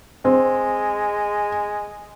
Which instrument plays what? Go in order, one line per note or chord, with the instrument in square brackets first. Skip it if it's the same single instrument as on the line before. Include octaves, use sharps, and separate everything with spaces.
[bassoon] G#3 [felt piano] C4